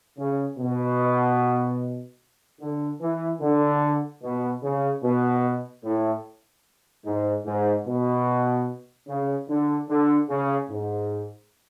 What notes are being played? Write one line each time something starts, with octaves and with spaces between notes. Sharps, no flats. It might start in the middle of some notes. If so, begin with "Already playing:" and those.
C#3
B2
D3
E3
D3
B2
C#3
B2
A2
G#2
G#2
B2
C#3
D3
D3
C#3
G#2